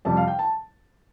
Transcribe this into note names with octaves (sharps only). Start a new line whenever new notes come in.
F2 C3 G3 A5
F5
G5
A5